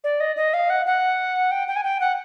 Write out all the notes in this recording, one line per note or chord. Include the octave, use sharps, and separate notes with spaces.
D5
D#5
D#5
F5
F#5
F#5
G5
G5
G#5
G5
F#5